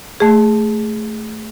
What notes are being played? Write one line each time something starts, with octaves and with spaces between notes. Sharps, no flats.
A3 G#4